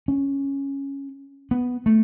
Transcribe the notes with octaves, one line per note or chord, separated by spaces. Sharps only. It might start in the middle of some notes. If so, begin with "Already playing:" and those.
C#4
B3
A3